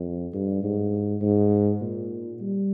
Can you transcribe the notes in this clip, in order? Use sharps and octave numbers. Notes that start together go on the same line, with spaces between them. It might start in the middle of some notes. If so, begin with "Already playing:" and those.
Already playing: F2
G2
G#2
G#2
A#2
G3